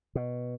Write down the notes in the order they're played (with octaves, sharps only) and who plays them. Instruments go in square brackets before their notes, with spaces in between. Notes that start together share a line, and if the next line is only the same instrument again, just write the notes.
[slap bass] B2